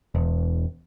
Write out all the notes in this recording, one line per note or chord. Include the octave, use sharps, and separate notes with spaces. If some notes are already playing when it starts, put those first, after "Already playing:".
E1